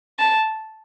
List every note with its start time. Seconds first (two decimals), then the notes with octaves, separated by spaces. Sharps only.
0.19 A5